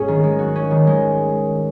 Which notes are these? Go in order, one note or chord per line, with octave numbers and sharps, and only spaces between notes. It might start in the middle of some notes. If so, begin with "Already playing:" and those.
Already playing: G#2 C#4 G#4
D#3
G#3
F#4
C#4
D#3
G#3